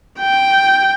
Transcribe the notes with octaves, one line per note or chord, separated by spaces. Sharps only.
G5